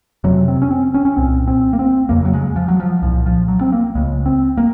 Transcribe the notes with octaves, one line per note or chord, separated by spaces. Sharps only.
F2 C3 F#3
C4
C#4
C4
C#4
C#4
C2 A#2 C4
C4
A#3
C4
F2 C#3 A#3
F#3
G#3
F3
F#3
F3
C2 A#2 F3
F3
F#3
C4
A#3
C#2 C#3 G#3
C4
A#3